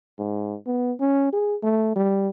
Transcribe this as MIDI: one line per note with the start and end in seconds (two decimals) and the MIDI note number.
0.19 0.56 44
0.66 0.93 59
1.00 1.31 61
1.33 1.55 68
1.63 1.93 57
1.96 2.29 55